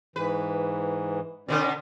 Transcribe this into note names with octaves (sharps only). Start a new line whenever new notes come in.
G#2 E3 B4
B2 D3 D#3 B3 C#4 D5